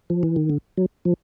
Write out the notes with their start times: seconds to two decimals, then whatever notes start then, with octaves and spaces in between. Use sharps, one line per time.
0.10 F3
0.23 E3
0.36 D#3
0.50 D3
0.77 F#3
1.05 F3